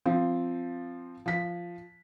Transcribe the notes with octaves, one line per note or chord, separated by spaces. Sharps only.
F3 C4
F3 B6